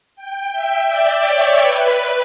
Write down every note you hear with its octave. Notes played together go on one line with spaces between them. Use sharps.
G5
E5
D5
C#5
B4